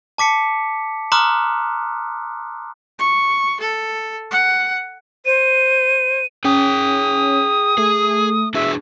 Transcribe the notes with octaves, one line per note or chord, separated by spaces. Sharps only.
A5 D6 B6 C#7
A#5 C6 D6 D#6 F6 F#6
C#6
A4
F#5
C5 D#7
C#4 G#4 G5 D#6
A3 G#4
D4 F#4 G#4 E5